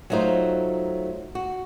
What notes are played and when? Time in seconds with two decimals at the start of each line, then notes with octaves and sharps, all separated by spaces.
0.10 F#3 A3 D#4 F4 C5
1.35 F#4